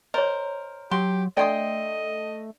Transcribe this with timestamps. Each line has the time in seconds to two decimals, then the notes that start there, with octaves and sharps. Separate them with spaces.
0.14 A#4 C5 C#5 D#5
0.91 F#3 G4 C6
1.37 A3 D4 D5 D#5 G5 C6 D#6